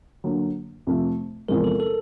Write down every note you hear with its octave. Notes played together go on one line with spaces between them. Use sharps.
D3 F#3 A#3
F2 C3 F3 A3
E2 C3 F3 G#3 A#4
A4
A4